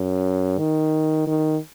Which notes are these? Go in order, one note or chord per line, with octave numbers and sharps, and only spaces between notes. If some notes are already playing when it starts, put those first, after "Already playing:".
Already playing: F#2
D#3
D#3